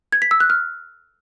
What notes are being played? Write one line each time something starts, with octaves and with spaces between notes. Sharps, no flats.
G#6
B6
E6
F#6
F6